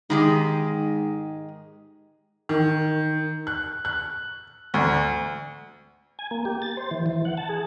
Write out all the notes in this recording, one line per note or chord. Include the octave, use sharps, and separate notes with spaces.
G#2 D#3 G#3 G4
D#3
F#6
F#6
D2
G#5
A#3
G4
A6
C5
E3
E3
F#5
A5
G#4